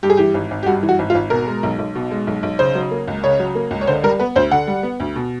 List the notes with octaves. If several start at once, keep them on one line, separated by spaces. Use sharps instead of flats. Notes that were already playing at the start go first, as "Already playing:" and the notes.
G2 G4
G#4
E3 G4
G#1
G#1
G4
G2 F#4
E3
F#4
G#1
F4
G#1
B2 A#4
G#3
B1
B1
B2
G#3
B1
B1
C#3 C5
F#3
A#3
C#2
C#3 C#5
F#3
A#3
C#2
C#5
D3 C5
G3 A#4
B3 B4
D2 C5
D3 F#5
G3
B3
D2
B2